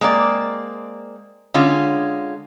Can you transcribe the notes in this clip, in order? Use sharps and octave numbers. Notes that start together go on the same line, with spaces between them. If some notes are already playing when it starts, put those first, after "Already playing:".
G#3 A#3 C4 D5
D3 G#3 C#4 F4